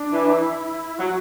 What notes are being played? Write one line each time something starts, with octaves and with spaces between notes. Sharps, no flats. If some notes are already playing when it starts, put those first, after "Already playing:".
Already playing: D4
E3
E4
F#3 F#4